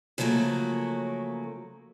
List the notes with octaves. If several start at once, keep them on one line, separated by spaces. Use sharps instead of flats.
C#3 F3 F#3 A3 A#3